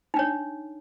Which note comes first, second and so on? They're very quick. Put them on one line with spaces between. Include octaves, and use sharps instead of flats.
D#4 D4 C#5